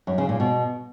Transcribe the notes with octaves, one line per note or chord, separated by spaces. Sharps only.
F#2
C#3
A#2
B2